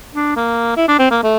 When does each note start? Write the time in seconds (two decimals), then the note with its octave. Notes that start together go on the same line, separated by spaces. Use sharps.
0.14 D4
0.36 A#3
0.76 E4
0.88 D4
0.99 C4
1.10 A#3
1.23 A3